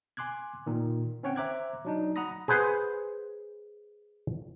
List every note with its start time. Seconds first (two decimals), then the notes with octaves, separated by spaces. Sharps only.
0.17 G#5 C6 D6 F#6 G#6
0.66 A#2 D#3
1.23 C4 C#4 C#5 F#5 G5
1.36 C5 E5 A#5 D6 F#6 G#6
1.85 F#3 D4 D#4
2.16 F#5 A#5 B5 D#6 A#6
2.48 G#4 B4 C5 F#5